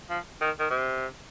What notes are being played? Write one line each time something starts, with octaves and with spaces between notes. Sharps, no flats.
F3
D#3
D#3
C3